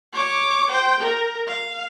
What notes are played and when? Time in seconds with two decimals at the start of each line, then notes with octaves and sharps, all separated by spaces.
0.13 C#5 D6
0.70 C5 G5
1.01 A#4
1.48 F5